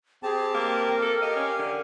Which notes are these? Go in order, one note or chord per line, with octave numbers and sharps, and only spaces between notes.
C4 G4 G#4 A5
A#3 A#4
A4
G4 D#5 F5
C#4
D3